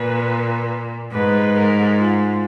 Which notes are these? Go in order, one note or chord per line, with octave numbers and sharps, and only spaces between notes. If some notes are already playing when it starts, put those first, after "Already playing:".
Already playing: A#2 B4
G#2 B4
A#4
F4